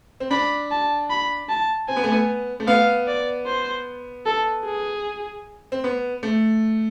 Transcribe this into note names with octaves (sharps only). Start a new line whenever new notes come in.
C4
D4 B5
A5
B5
A5
C4 G#5
B3
A3
B3
A3
B3 F5
D5
C5
A4
G#4
C4
B3
A3